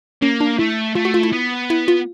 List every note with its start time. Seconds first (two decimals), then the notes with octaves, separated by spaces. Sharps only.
0.22 A#3 C#4
0.40 D4
0.59 A3 E4
0.95 A3 F4
1.05 F#4
1.14 F4
1.23 E4
1.32 B3
1.70 E4
1.88 F4